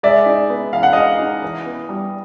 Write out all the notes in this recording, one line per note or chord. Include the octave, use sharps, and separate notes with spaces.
G#3 D5 E5
D#4
B3
E3 F5
F#5
G#3 D#5 F5
D#4
E3
B3
G3